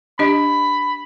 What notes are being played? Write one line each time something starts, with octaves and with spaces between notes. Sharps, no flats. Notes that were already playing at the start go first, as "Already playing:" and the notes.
D4 G4 D#5 B5